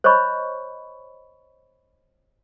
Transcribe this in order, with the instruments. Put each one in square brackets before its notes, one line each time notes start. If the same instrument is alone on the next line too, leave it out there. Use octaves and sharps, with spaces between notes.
[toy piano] C5 C#5 D#5 B5 C#6